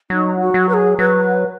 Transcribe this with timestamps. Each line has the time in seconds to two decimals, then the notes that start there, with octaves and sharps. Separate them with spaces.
0.10 F#3 D#4
0.40 F#4
0.54 F#3
0.69 B4
0.74 G#4
0.98 F#3 B4